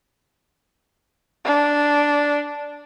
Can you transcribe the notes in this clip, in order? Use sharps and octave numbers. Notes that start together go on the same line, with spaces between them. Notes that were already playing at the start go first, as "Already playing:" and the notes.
D4